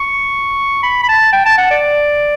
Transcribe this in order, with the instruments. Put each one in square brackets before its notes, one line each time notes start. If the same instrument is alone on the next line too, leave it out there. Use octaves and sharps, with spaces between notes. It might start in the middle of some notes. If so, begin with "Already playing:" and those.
Already playing: [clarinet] C#6
B5
B5
A5
G5
A5
F#5
D5